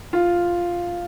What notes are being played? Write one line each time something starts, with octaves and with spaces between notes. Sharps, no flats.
F4